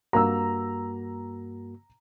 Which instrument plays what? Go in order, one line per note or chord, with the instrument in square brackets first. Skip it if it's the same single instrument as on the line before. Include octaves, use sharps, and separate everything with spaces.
[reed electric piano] G2 A#3 F#4 [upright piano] A#5 E6